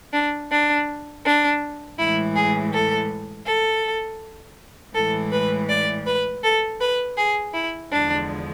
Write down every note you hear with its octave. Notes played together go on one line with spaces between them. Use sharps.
D4
D4
D4
A2 E3 G#3 E4
G#4
A4
A4
A2 E3 G#3 A4
B4
D5
B4
A4
B4
G#4
E4
E2 D3 F3 G#3 D4